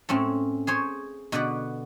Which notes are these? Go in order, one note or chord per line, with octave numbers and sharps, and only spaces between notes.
A2 C4 C#4 A4
G#4 C5 C#5
B2 D3 B3 B4 D5 F#5